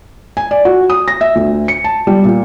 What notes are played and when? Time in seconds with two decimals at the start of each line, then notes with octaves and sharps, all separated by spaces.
0.37 G#5
0.51 D5
0.65 F#4
0.90 D#6
1.08 A#6
1.21 E5
1.35 D2
1.68 C#7
1.84 A5
2.07 G3
2.24 A#2